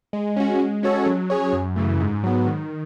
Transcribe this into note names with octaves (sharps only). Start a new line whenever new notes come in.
G#3
C#4 F#4
G#3
C#4 F#4 A4 C#5
F#3
C#4 G#4 C#5
F#2
C#3 E3 A3
G#2
F#3 B3
D#3